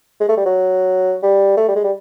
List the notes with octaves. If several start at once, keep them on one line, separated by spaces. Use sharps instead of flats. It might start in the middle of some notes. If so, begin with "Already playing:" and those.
G#3
A3
G3
F#3
G3
A3
G3
G#3
G3